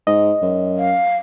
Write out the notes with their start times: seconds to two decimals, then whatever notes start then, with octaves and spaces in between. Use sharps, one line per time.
0.07 G#2 D#5
0.42 F#2
0.78 F5